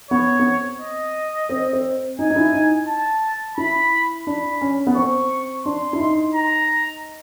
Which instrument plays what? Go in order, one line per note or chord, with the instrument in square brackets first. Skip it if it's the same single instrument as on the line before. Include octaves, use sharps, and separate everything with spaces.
[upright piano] B3 [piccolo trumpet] C#5
[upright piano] B3
C4
[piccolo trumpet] D#5
[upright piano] C4
C4
[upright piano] D#4 [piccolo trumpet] G#5
[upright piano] D#4
E4
D#4
[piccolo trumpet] A5
[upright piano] E4 [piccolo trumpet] B5
[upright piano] D4 [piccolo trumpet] B5
[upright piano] C#4
B3
[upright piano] C4 [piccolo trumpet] C#6
[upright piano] D4 [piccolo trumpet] C6
[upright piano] E4
D#4
[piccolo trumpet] A#5